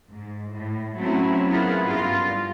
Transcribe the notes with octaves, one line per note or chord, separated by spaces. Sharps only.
G#2
A2
F#3 A3 C4 C#4 E4
B3 E4 F4 G#4 A#4
G2 F4